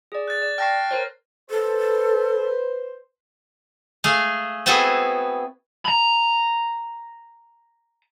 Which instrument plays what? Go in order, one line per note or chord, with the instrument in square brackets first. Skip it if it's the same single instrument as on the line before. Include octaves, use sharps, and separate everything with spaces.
[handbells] G#4 D5
[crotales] F#6 A6
[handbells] D5
[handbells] G5 A5 C#6 [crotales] F6 A#6 C7
[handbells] A#4 C5 C#5
[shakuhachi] A4 [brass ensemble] B4 C5
[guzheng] A3 G#4 F5
B3 C4 E4 F#4 G#4 A4
[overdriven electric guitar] A#5 B5